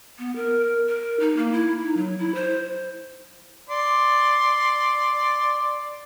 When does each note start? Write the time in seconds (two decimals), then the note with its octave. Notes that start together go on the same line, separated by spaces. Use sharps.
0.19 B3
0.35 A#4
0.87 A#4
1.20 D#4
1.37 A#3
1.52 E4
1.83 D#4
1.97 F#3
2.18 E4
2.35 C5
3.69 D5 C6